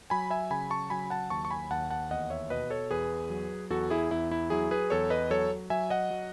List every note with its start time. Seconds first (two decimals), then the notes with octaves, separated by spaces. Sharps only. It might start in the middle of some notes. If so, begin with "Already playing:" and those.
0.10 F#3 G#5 B5
0.30 E5 G#5
0.50 C#3 G#5 B5
0.70 A5 C#6
0.90 F#3 G#5 B5
1.10 F#5 A5
1.30 D#2 A5 C#6
1.45 C#6
1.51 G#5 B5
1.70 D#2 F#5 A5
1.90 F#5 A5
2.10 E2 D#5 F#5
2.30 C#5 E5
2.50 B2 B4 D#5
2.70 A4 C#5
2.91 E2 G#4 B4
3.30 F#3
3.70 E2 F#4 A4
3.90 E4 G#4
4.11 E2 E4
4.31 E4
4.50 F#3 E4 G#4
4.71 G#4 B4
4.90 E2 A4 C#5
5.10 B4 D#5
5.30 F#3 A4 C#5
5.70 F#3 E5 G#5
5.90 D#5 F#5
6.11 F#3